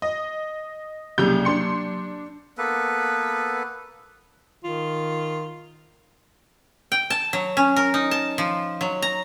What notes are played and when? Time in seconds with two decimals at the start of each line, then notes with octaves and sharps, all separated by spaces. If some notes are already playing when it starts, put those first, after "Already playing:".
0.02 D#5
1.18 C2 C#3 F#3 A#3 G4 G6
1.45 D4 C6 C#7
2.58 A#3 B3 A4 B4
4.64 D#3 F4
6.92 G5
7.10 A5
7.33 F#3
7.57 C#4
7.76 A#4
7.94 D#4
8.11 A5
8.38 F3
8.81 F#3
9.02 A#5